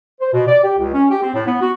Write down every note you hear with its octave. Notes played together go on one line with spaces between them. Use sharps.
C5
B2
D5
G4
C#2
C#4
G4
C4
A2
B3
F#4